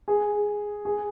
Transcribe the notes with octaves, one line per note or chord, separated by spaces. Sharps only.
G#4
G#4